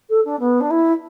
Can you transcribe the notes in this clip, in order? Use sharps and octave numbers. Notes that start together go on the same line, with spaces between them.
A4
D4
B3
D4
E4